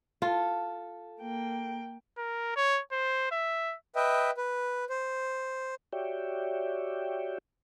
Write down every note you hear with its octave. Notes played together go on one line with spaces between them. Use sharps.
F4 A4
A#3 G5
A#4
C#5
C5
E5
B4 D#5 E5 G5
B4
C5
F#4 G4 C#5 D5 E5 G5